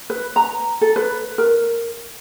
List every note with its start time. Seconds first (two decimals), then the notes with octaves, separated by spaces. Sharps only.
0.10 B4
0.36 A#5
0.81 A4
0.96 B4
1.38 A#4